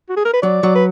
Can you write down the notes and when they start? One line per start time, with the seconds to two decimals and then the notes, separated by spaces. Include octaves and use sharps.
0.09 F#4
0.17 G#4
0.25 A#4
0.33 B4
0.42 F#3 D5
0.63 F#3
0.75 B4